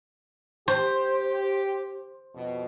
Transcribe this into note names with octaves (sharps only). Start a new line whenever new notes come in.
G4 C5
F2 B2